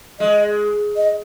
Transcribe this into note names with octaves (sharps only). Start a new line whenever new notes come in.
G#3 D#5
D#5